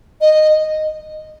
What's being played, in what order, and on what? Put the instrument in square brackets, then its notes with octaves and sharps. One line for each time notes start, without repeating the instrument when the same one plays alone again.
[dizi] D#5